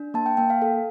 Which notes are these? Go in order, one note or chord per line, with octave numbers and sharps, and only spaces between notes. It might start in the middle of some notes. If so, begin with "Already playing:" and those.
Already playing: D4
A#3 A5
G5
A#3 G5
F5
A4